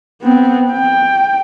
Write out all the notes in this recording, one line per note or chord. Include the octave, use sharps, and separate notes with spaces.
B3 C4
G5